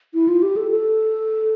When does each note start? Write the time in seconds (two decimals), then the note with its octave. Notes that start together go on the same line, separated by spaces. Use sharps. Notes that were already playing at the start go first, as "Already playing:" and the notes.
0.14 E4
0.28 F4
0.42 G4
0.56 A4
0.71 A4